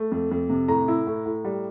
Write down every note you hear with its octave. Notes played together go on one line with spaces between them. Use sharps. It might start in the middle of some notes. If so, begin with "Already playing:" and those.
Already playing: A3
F2
F2
C3
A2 A#5
E4
A2
A2
G3